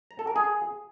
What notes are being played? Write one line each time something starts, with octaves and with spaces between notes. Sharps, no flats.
A#5
A4
A#4
G#4